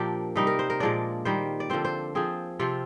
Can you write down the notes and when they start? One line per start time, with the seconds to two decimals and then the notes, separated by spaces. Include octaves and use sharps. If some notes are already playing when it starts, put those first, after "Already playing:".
Already playing: A#2 F3 A#3 D4 G4
0.36 C3 G3 A#3 D#4
0.47 A#4
0.59 C5
0.70 A#4
0.80 A#2 F3 G#3 D4 D5
1.25 D#3 G3 A#3 C5
1.60 D5
1.70 D3 F3 C4 C5
1.85 C5
2.15 F3 C4 G#4
2.59 C3 F3 C4 F4